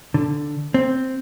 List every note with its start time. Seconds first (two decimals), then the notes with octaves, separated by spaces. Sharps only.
0.14 D3
0.74 C4